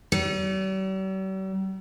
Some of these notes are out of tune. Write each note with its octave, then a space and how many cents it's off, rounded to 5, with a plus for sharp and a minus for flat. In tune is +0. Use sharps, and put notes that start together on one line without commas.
G3 -45